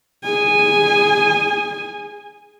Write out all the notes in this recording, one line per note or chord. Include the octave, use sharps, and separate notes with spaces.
G#4 G#5